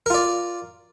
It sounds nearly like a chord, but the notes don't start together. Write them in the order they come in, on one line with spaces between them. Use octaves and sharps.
A#4 F4 D5